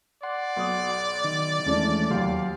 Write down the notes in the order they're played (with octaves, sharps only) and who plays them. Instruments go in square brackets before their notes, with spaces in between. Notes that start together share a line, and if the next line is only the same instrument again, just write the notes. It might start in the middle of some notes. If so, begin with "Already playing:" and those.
[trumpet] D5 [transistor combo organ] F#5 C6
[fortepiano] B1 D#6
[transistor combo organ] D#3
[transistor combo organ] E2 G#3 A3 [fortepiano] C#4 D4
[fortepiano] D#2 G4 F5 [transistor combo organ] F#3 C6